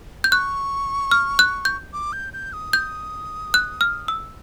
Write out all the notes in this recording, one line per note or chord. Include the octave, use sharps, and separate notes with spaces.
G6
C#6 F#6
F6
F#6
G6
D6
G6
G6
D#6
G6
F#6
F6
E6